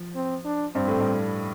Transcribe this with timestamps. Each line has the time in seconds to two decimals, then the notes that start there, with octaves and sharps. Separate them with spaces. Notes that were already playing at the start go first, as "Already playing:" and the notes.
Already playing: F3
0.15 C4
0.45 D4
0.75 G2 C4
0.87 A2
1.00 G2